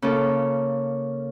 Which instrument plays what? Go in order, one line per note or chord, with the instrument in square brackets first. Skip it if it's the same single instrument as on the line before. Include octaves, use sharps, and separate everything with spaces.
[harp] C#3 A#3 F4 A4